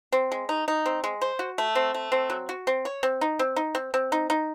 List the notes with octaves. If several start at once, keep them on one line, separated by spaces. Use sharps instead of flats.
C4
G#3
D#4
D#4
C4
G#3
C5
F#4
A3
C4
A3
C4
F#3
F#4
C4
C#5
C4
D#4
C4
D#4
C4
C4
D#4
D#4